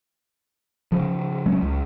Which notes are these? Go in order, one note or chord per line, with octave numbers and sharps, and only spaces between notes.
C#3 F3
F#3 G#3 A3 C#4
C#2